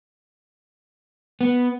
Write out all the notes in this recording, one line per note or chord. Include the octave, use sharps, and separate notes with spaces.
B3